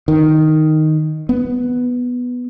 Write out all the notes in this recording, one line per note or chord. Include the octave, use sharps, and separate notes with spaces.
D#3
B3